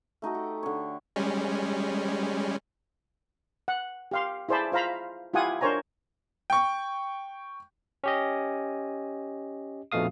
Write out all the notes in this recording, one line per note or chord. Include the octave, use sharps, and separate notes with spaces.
A3 D#4 F#4 A4
G4
D3 C#5
G3 G#3 C#4
F#5
G4 F5 C6
E4 G#4 C5 D5 A5 B5
F4 C5 F5 A#5 B5
E4 F4 G4 F#5 G#5 D#6
D4 A#4 C5 C#5 G#5 A#5
G5 C#6
C#4 G4 D#5
A#1 F2 B2 A3 F5 D#6